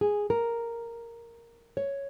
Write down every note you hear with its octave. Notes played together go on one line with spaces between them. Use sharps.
G#4
A#4
C#5